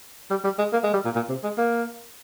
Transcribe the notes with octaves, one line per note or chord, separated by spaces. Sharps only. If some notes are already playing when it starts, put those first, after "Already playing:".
G3
G3
G#3
A#3
G#3
G3
A#2
A#2
C3
G#3
A#3